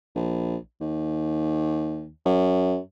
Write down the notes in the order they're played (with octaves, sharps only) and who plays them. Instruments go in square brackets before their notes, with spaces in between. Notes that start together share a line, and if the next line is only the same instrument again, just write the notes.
[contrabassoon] A#1
D#2
F#2